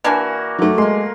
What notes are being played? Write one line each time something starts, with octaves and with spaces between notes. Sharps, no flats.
E3 A#3 D4 F#4 G#5
F#3 A3
G#3 A#3 C6